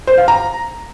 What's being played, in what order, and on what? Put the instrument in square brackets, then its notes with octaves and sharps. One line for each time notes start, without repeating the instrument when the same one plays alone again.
[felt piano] C5
F5
A#5